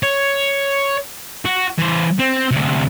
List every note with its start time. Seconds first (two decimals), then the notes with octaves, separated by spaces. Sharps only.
0.03 C#5
1.45 F#4
1.79 E3 C5
2.19 C4
2.51 D2 C3